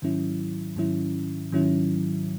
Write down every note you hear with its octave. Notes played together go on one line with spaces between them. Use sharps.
G#2 D#3 F#3 C#4 E4
G#2 D#3 F#3 C#4 E4
G#2 D#3 F#3 C#4 E4